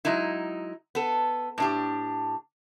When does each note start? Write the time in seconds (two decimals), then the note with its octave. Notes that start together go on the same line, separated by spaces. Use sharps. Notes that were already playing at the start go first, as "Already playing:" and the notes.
0.05 F#3 G#3 D#4 E4
0.95 B3 A4
1.58 A2 D4 G4